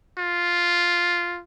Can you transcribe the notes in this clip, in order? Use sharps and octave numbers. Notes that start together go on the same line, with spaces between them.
F4